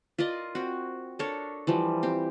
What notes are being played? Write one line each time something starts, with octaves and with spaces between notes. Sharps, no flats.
F4 A#4 D5 D#5
C4 F#4
D4 A4 A#4 C#5
E3 F3 G3
C4 G4